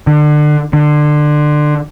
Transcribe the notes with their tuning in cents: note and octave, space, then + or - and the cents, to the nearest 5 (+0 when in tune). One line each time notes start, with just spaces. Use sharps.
D3 +30
D3 +25